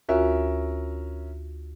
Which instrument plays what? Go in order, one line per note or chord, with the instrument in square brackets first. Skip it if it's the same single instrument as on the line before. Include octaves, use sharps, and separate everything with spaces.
[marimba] D2 F4 F#4 [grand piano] C#4 A#4 E5